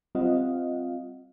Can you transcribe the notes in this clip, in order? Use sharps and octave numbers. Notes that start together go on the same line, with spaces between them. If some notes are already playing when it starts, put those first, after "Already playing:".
G3 C4 F4 D#5 F5 F#5